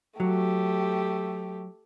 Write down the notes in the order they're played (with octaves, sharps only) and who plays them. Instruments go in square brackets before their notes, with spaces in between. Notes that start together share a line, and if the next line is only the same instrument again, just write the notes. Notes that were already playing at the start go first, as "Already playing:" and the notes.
[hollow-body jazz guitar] F#3 [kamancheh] A3 G4